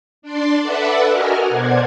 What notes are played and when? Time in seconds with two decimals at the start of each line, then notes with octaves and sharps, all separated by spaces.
0.22 D4 D5 C6
0.62 A4 B4 D5 E5 F#5
1.11 F#4 A#4 D#5 G#5 F6
1.49 B2 C5 D5 F#5 G#6